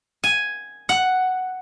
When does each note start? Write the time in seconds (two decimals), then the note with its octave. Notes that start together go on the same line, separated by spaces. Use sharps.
0.24 G#5
0.89 F#5